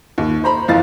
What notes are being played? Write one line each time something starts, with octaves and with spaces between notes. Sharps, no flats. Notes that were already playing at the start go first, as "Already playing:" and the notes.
D#2
C5 A#5 B5
F#1 F2 E3 F5 A6